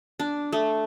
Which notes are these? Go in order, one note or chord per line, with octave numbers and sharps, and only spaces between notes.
D4
A3